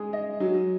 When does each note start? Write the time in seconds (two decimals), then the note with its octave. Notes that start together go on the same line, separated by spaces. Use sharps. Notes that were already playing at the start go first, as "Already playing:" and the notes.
Already playing: G#3 G#4
0.13 D#5
0.40 F#3